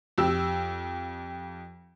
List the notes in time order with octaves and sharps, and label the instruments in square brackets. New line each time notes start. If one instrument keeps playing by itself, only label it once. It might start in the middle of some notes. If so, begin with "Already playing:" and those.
[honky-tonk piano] F2 G4 E6